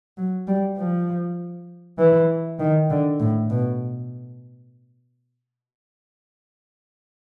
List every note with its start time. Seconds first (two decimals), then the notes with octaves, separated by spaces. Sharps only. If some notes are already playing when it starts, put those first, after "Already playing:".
0.17 F#3
0.47 G3
0.77 F3
1.98 E3
2.59 D#3
2.90 D3
3.20 A2
3.50 B2